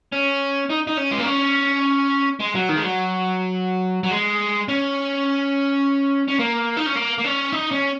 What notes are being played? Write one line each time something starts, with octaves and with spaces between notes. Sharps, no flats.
C#4
D#4
D#4
C#4
G#3
A#3
C#4
G#3
F#3
D#3
G#3
F#3
F#3
G#3
C#4
C#4
A#3
D#4
C#4
A#3
A#3
C#4
D#4
C#4